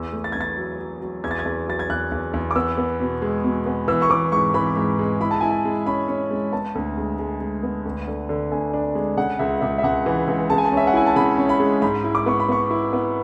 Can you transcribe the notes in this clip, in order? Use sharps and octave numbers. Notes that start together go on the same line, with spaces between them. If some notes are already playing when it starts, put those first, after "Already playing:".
Already playing: E2 E6
A3
A6
E2 G#6
A6
F#3
F#3
F#3
E2 G#6
A6
G#6
E2
F#3 A6
G#6
E2 F#6
E2
E2
D6
B3 E6
B3
B2
G#3
B2
B3
E3 E6
C#6
E3 D6
G#2 C#6
E3 B5
G#2
G#3
E4 B5
A5
E4 G#5
A5
G#3
C#4 B5
C#4
G#3
B3 A5
D2
G#3
G#3
G#3
B3
D2
D3
D3
D2 G#5
D4
G#3
C#3 F#5
C#2 E5
C#2 E5
E5
C#2 F#5
E3
C#2
C#3 A5
G#5
A5
C#4
E5
F#5
E4 G#5
A5
C#3 B5
C#4
B5
G#3
G#2 B5
E4
D6
B3 C#6
B5
B3 C#6
E4
B3